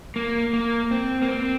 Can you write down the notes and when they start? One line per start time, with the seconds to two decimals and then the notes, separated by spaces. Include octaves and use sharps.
0.16 A#3
0.53 A#3
0.91 C4
1.22 A#3
1.28 C4